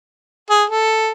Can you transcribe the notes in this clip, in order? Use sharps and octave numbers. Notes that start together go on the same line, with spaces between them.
G#4
A4